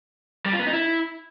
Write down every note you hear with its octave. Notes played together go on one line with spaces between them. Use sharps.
G3
F4
B3
D#4
E4